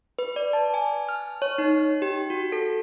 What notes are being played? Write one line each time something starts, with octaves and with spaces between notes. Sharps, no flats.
B4
D5
A5
G#5
F6
C#5
D#4
G4
F#4
A4